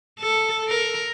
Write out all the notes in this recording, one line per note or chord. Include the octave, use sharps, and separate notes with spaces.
A4
A#4